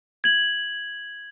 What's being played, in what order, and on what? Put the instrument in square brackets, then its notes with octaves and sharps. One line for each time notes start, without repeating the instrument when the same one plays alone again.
[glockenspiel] G#6 F#7